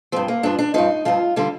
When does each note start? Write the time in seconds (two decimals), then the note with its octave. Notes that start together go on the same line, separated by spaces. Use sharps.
0.12 G2 F3 C4
0.28 A#3
0.43 G2 F3 D4
0.59 D4
0.74 G2 F3 D#4
1.05 G2 F3 F4
1.36 D3 G3 F4